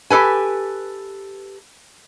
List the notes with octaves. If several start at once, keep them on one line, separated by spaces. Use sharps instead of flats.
G4 A4 B4 G#5